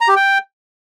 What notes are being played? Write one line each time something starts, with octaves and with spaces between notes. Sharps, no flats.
A#5
G4
G5